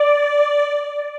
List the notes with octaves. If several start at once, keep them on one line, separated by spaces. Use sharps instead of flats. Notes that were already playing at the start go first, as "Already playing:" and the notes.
Already playing: D5